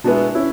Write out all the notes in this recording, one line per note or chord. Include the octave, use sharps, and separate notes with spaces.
B2 G#3 B3 D4 E4
C#4 E4